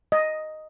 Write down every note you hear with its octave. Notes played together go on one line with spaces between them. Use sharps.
D#5